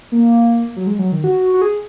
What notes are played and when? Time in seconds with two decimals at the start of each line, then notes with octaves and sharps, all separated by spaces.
0.12 A#3
0.76 F#3
0.87 G#3
0.99 F#3
1.12 D#3
1.24 F#4
1.54 F#4
1.62 G#4